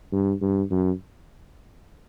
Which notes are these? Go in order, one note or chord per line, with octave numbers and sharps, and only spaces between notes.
G2
G2
F#2